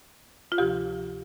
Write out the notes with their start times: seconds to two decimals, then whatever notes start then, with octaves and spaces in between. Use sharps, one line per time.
0.52 F4
0.58 D2 C3 F3 G4